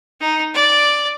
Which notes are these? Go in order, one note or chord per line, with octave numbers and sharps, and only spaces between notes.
D#4
D5